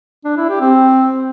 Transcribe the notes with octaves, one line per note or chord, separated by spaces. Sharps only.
D4
E4
G4
C4